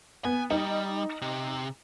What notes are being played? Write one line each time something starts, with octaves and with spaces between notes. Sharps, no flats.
B3 G#5
G3 D#4
C3